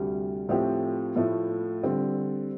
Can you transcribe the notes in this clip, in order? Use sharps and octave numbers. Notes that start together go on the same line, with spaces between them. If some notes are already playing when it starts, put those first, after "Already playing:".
Already playing: D2 C3 G3
A2 F3 A3 C4 G4
A2 F3 A3 E4
D3 G3 C4